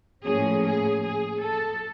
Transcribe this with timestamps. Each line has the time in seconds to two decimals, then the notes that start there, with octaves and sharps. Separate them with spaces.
0.24 A2 F3 A#3 C#4 G#4
0.63 G#4
1.03 G#4
1.42 A4